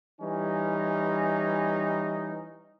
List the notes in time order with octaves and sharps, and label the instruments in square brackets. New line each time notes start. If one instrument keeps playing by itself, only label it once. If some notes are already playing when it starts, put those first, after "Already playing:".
[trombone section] E3 G3 C#4 D#4